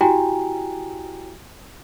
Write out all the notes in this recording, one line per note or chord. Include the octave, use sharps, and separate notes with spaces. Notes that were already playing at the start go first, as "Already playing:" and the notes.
E4 F#4 G4 G5 G#5 A#5